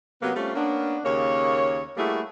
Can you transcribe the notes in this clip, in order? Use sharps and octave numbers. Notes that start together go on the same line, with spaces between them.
C3 F#3 A#3 B3
G3 A3 C4 C#4 F4
A#3 B3 C#4 D4
D#2 C#3 A#3 C#5
G3 A3 A#3 E4 F#4 G#4